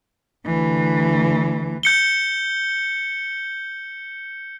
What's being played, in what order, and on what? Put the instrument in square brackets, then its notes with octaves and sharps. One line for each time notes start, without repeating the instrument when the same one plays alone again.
[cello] D2 E3
[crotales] G6 C#7 G7